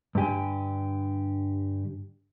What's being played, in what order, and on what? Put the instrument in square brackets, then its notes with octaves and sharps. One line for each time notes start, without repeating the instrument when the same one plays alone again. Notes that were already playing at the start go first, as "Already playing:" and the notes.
[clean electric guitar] G2 D3 G4 G#5